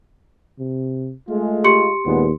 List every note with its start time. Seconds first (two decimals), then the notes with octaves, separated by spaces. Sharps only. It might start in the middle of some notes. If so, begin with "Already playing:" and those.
0.59 C3
1.29 G#3 A3 F4
1.64 G4 C6 C#7
2.06 D#2 A#2 G#3 B3